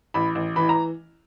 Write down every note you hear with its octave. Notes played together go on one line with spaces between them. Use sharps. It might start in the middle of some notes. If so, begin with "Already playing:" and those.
A1 B5
A1
E3 B5
A#5